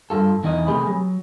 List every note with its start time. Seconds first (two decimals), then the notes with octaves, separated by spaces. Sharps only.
0.10 G2 F4 A4
0.44 E2 E3 D#4 E4 D#5
0.67 C3 A3 G4 G#4 B4 B5
0.87 F#3